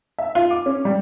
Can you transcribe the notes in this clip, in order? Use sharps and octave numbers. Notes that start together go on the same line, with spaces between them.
E5
F4
D6
C#4
G3